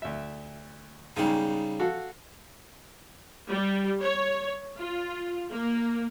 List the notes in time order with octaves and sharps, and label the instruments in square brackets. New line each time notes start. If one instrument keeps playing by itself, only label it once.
[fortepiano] D2 E5
[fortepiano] B1 G#2 [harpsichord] C#3 G3 [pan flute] D#4
[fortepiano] F#4 A4 F5
[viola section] G3
C#5
F4
A#3